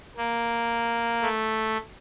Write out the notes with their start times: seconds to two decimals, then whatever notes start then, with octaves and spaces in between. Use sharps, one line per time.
0.17 A#3
1.22 A3